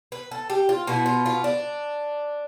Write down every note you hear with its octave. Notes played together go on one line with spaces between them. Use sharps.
B4
A4
G4
F4
B2 B3 E4
F4
F4
D4